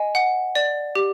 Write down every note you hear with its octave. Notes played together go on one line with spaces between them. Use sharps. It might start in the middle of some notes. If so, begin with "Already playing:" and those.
Already playing: D#5 G#5
F#5
D5
G4